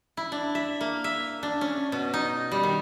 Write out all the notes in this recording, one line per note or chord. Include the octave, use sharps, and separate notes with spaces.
E4
D4
E5
A#3
E5
D4
C#4
B2
D#4
G3
D#3